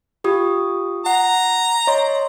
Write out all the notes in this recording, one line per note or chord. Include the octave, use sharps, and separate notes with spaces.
F4 G4 D#6
F#5 A#5
C#5 D#5 C6